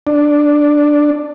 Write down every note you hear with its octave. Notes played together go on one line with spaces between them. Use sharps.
D4